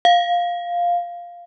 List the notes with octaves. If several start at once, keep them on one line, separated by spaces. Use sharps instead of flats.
F5